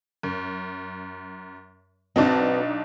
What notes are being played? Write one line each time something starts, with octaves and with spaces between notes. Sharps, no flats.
F#2
B1 C4 D4 D#4 F#4 B4